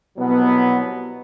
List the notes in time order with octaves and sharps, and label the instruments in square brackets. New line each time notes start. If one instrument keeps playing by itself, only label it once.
[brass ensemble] C2 B2 F#3 B3